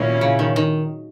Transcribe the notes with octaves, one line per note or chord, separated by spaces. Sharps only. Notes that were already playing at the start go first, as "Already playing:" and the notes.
Already playing: A#2 D#3 F#3 A#3 C#4 E4
C#3
D#3
D#3